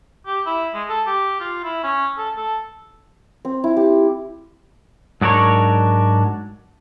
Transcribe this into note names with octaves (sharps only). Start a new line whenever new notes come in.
G4
E4
G#3
A4
G4
F4
E4
C#4
A4
A4
C4
E4
G4
G#2 F#3 D4 A#4 C#5